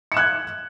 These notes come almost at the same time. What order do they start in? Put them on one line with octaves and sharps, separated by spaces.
C#7 E7 F#6 G#6